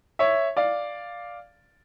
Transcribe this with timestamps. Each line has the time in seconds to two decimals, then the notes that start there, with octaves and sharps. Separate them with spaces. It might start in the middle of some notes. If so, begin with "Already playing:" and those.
0.19 C#5 E5
0.57 D5 F5